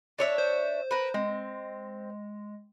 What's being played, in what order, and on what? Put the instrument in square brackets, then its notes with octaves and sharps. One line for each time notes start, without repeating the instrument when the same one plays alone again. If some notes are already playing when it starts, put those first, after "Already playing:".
[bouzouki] D4 C#5 E5
[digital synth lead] C5
[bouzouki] A#4 B4
[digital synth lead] G#3 [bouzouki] C4